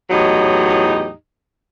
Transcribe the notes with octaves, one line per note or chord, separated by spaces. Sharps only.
E2 A2 F#3 D#4 G4 D#5